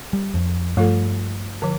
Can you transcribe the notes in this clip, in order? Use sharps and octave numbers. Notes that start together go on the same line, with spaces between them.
G3
F2
G2 F3 A3 F4 A4
D3 F3